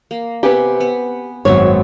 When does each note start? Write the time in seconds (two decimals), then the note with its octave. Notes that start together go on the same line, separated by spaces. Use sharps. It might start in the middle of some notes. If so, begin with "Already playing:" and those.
0.11 A#3
0.43 C3 B3 G4 B4 G#5
0.80 B3
1.45 G#1 F#2 B3 C4 C#5